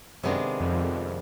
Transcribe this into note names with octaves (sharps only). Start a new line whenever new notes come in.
F#2 C3 D#3 G#3 B3 D4
F2